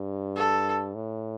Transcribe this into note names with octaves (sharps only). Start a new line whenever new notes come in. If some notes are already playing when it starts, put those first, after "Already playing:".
Already playing: G2
A4
A2